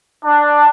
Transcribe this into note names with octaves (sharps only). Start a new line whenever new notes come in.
D4